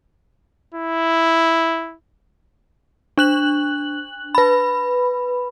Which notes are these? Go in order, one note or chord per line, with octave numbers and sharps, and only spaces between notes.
E4
D4 F#6 F#7
B4 B5